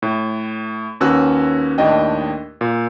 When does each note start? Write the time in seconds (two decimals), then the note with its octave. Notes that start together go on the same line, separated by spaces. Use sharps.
0.02 A2
1.00 D#2 C#4 F#4 B4 E6 F#6
1.78 D#2 A2 D4 D#5 G5
2.61 A#2